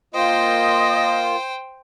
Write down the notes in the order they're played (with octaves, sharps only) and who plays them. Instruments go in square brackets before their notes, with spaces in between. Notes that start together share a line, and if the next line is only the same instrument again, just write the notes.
[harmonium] A#3 F4 [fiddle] C5 G5 [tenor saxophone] D#5